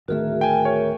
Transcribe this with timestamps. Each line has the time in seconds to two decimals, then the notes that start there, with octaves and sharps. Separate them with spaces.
0.08 D1 D#3 A3 F#4 G#4 A#4 E5
0.41 G5 G#5
0.65 A#4 C#5